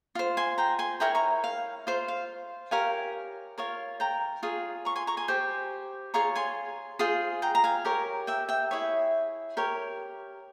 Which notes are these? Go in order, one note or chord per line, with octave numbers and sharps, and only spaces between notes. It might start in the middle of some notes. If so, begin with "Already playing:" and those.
F4 C5
G#5 C6
G5 A#5
G#5 C6
E4 A#4 C#5 G5 A#5
A#5 C#6
F5
F4 C5
F5
G4 A#4 C#5 F5 G#5
F4 A#4 C#5
G5 A#5
F4 G#4 C#5
A#5 C#6
G#5 C6
A#5 C#6
G#5 C6
G4 C5
F4 G#4 C#5 A#5 C#6
G#5 C6
F4 G#4 C5
G5 A#5
A#5
F5 G#5
G4 A#4 C#5
E5 G5
E5 G5
E4 G#4 C#5 E5
G4 A#4 C#5